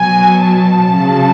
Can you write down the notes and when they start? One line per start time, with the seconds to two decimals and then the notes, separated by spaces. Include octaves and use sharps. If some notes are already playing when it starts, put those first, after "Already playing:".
Already playing: B2 F#3 G#5
0.40 A5
0.94 C#3 F#3